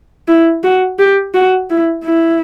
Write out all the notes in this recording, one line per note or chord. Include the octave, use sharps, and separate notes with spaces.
E4
F#4
G4
F#4
E4
E4